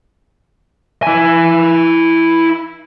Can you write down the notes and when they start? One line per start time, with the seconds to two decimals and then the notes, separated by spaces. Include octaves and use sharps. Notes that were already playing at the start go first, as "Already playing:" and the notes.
1.02 E4 G#5